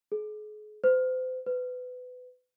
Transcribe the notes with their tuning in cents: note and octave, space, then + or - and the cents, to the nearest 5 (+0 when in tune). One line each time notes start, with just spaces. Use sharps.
G#4 +40
C5 -35
B4 +25